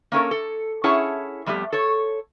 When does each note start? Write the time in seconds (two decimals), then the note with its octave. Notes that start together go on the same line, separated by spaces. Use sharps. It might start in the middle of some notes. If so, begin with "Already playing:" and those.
0.12 A#3 C#4 A4 A#4
0.31 A4
0.84 C#4 E4 G#4 C#5 F#5 A5
1.46 F2 G3 A3 B3 G4
1.73 A4 C#5